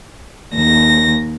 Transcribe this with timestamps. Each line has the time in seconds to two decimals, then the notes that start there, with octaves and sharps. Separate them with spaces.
0.55 D#2 A#6